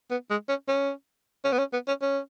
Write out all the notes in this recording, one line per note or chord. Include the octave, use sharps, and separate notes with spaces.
B3
G#3
C#4
C#4
C#4
B3
C#4
B3
C#4
C#4